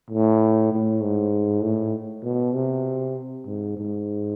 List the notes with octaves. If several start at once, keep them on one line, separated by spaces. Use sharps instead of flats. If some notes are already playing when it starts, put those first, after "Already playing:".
A2
A2
G#2
A2
B2
C3
G#2
G#2